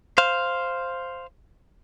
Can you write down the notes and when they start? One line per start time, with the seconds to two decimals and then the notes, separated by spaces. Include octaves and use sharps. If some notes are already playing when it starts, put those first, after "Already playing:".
0.18 C5 F5